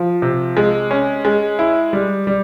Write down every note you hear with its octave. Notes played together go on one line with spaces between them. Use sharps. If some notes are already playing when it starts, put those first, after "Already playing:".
Already playing: F3
C3
G#3
C#4
G#3
E4
G3
G3